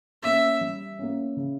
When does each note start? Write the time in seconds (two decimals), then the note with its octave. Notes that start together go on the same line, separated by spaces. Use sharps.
0.22 A#3 C#4 E5
0.61 G3
0.99 A#3 C#4
1.37 C#3